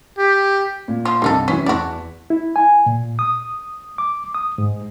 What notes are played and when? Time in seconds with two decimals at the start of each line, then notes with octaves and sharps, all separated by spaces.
0.18 G4
0.88 A#2
1.05 F3 F4
1.22 C2 G2 A#3 D#4 A4
1.48 F#2 E3 C#4 B6
1.66 E2 F#4 D5 F#5 A5
2.30 E4
2.56 G#5
2.86 A#2
3.19 D#6
3.98 D6
4.34 D#6
4.58 G#2